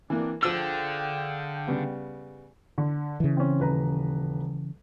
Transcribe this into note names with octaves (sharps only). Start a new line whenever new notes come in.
E3 A#3 C4 D4
D3 F3 G#4 F5 G5 E6
C#3 G3 B3
D3
C#3 E3
C4 C#4
D#1 B4 A#5